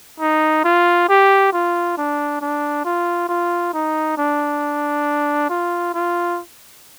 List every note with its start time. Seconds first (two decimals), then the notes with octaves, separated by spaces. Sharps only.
0.20 D#4
0.64 F4
1.09 G4
1.53 F4
1.97 D4
2.41 D4
2.85 F4
3.29 F4
3.73 D#4
4.17 D4
5.49 F4
5.94 F4